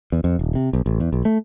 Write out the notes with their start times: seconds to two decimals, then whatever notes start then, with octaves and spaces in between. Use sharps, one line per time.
0.12 E2
0.24 F2
0.39 D#1
0.55 C3
0.73 B1
0.86 A1
1.00 E2
1.13 B1
1.25 A3